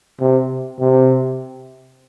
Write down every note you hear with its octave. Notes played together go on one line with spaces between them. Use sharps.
C3
C3